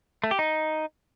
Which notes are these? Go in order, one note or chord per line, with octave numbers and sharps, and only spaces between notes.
A3
G4
D#4